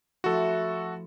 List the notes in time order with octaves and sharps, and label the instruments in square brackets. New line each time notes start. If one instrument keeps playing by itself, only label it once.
[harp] F3 A3 E4 [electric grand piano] F#4 A4